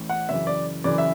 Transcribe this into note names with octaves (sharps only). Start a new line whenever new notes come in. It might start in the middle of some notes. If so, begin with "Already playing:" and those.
Already playing: A1 A2 E3
F#5
F#1 F#2 E3 E5
D5
F#1 F#2 E3 D5
E5